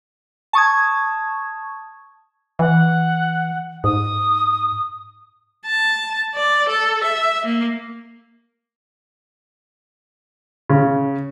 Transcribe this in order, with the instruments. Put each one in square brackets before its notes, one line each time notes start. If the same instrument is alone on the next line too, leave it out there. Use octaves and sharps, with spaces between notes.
[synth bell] A5 C#6 D#6 G#6
[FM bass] E3 [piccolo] F#5
[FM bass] G#2 [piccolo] D#6
[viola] A5
D5
A4
E5
A#3
[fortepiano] C#3